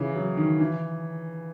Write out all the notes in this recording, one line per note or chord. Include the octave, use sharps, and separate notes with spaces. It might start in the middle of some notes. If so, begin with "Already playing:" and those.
Already playing: C#3 E3
F#3
D#3
E3